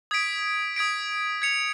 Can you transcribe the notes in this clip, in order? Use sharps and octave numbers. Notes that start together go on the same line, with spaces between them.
D#6 G#6 B6 D7
D#6 G#6 B6 D7
G#6 C#7 F7